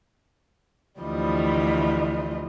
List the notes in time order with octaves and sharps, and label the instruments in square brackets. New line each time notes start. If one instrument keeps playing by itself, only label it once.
[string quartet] D2 E3 F3 G3 D#5